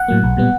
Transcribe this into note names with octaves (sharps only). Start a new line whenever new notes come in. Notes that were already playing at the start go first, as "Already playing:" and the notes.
Already playing: F#5
A2 F#3 A#3
B1
A#2 G3 B3